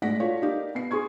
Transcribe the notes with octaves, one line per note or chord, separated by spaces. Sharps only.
A2 G#3 D5 F#5 A#6 B6
F4 F#4 A4 C#5 D5 F5
A#3 D#4 G4 D5 F5
B3 C7
G#4 C6 C#6 G#6